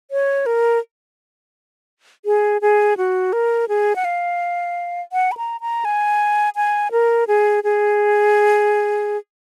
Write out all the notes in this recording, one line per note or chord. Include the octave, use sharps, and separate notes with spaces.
C#5
A#4
G#4
G#4
F#4
A#4
G#4
F#5
F5
F#5
B5
A#5
A#5
G#5
G#5
A#4
G#4
G#4